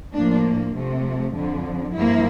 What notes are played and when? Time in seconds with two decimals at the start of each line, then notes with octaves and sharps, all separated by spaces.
0.14 A2 F3 A#3 D4
0.75 C3 F3 A3
1.35 F2 D3 F3
1.95 G2 F3 A#3 E4